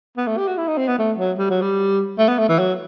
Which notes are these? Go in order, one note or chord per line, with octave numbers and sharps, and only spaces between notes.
B3
A3
G4
F#4
E4
D#4
C4
B3
A3
F#3
G3
F#3
G3
A3
B3
A3
E3
F#3